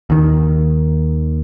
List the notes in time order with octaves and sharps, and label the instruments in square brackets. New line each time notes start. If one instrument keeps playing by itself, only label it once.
[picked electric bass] D#2 D#3